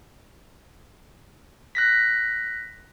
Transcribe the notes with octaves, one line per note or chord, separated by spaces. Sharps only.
F#6 A#6 B6